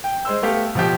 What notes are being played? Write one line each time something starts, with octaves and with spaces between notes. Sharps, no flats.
G5
G#3 C5 E6
A3 B3 G4 F5
B2 F3 G4